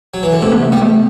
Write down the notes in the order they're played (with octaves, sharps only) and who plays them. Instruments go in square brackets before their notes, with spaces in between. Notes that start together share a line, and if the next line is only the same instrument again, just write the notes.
[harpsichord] F#3
E3
D3
[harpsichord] C3 [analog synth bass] A3
[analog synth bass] B3
A3
[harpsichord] G3 [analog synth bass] B3
[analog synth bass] A3